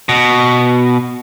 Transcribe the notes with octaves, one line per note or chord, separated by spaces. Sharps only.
B2